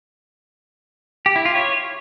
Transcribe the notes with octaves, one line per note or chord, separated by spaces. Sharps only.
G4
E4
F4
C#5